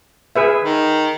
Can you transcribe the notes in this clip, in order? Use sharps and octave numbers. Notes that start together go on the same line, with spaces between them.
G#4 B4 E5
D#3